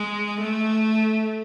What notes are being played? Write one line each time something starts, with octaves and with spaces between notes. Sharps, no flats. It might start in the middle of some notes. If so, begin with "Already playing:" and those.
Already playing: G#3
A3